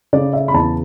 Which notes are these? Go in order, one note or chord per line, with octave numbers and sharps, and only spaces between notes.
C#3 D5
E5
B5
E2 A5